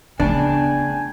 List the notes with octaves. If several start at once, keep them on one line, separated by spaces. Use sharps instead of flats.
C#3 A3 B3 D4 G5 G#5